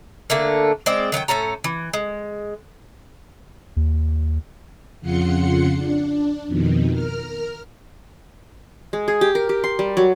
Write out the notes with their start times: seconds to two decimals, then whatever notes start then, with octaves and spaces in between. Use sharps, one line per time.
0.30 D3 A3 A#3
0.86 G#3 C4 D5 G5
1.12 D#3 F#3 F#4 G5
1.28 A2 C#4 A4 A#5
1.64 E3
1.93 G#3
3.76 D#2
5.01 F2 C#3 F4 F#5 C6 C#7
5.75 D4
6.47 F2 B2 D#3
6.92 A#4 F6
8.93 G#3
9.08 G#4
9.21 G4
9.35 A#4
9.49 G4
9.64 C6
9.79 G3
9.97 F#3